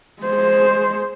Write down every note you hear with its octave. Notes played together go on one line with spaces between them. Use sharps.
G#3 C5